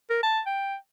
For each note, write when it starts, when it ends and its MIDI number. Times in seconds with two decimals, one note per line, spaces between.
0.10 0.22 70
0.23 0.41 81
0.46 0.76 79